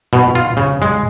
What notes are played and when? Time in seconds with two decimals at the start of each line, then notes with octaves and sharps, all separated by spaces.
0.13 B2
0.35 F4
0.57 C#3
0.82 G#3